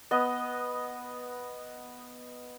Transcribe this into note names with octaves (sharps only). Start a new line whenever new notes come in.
B3 D#5